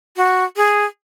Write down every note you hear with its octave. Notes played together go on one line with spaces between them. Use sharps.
F#4
G#4